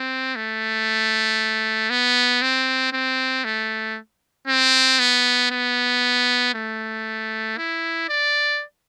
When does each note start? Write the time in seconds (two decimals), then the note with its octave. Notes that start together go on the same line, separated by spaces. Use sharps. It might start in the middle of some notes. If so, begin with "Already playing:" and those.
Already playing: C4
0.36 A3
1.90 B3
2.42 C4
2.93 C4
3.44 A3
4.48 C4
4.99 B3
5.51 B3
6.54 A3
7.57 E4
8.09 D5